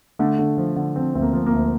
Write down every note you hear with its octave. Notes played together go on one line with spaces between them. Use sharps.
D3 A3
D3
F3
D3
F3 C4
D2 C4
A#3
F3
A#3
D2